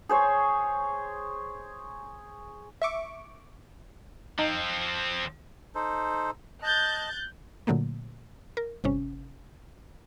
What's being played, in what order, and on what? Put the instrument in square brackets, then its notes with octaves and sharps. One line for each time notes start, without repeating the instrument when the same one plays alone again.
[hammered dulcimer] G#4 C5 C#5
[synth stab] E5 C#6 D6
[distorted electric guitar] F3 C4 [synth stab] D#4
[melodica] D#4 A4 C5
[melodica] D#5 A5 [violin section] F#6 G6 A6
[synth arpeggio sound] A#2 D3 F#3 A3 A#3
A#4
G1 C3 C#4